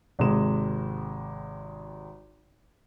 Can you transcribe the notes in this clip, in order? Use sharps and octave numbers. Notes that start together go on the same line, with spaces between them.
G#1 C3 G#3 E7